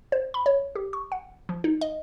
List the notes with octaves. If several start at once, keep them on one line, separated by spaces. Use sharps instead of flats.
C5
B5
C#5
G4
C#6
F#5
F3
D#4
D#5